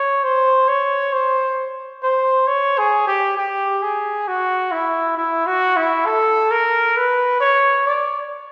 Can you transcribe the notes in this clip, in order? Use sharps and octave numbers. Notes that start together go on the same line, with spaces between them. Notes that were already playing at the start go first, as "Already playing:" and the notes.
Already playing: C#5
C5
C#5
C5
C5
C#5
G#4
G4
G4
G#4
F#4
E4
E4
F#4
E4
A4
A#4
B4
C#5
D5